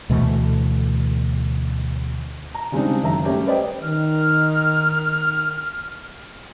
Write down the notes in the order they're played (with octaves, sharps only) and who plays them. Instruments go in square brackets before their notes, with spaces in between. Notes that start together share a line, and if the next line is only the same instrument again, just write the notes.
[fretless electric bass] D2 B2 E3 A3
[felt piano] A#5
C#3 G3 G#3 C4 D4 D#4
F#1 D#3 E5 A#5
G3 A3 C#4 G4
B4 C5 D5 D#5 G5
[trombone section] D#3 [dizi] F6